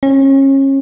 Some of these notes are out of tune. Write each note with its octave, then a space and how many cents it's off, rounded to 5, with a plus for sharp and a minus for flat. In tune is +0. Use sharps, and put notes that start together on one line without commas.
C#4 -30